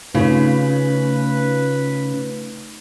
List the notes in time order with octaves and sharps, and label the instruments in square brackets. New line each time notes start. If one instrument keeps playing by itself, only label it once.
[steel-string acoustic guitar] C#3 [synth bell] A3 D#4 F4 [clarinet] B4